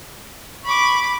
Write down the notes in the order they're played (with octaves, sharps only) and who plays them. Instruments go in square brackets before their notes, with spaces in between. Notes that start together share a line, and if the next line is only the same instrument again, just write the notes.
[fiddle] B5 D6 [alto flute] C#6